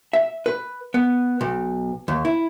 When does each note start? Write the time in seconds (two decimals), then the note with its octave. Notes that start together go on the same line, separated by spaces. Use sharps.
0.13 E5
0.46 B4
0.94 B3
1.41 B1
2.08 D#2
2.25 E4